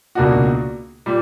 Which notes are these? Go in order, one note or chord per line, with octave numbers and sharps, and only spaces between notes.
C#2 B2 A#3 D4 F#4
A#2 G3